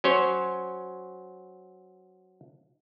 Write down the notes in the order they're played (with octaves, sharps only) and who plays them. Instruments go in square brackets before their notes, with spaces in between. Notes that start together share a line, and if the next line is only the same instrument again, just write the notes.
[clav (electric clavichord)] F#3 C#4 C5 C#5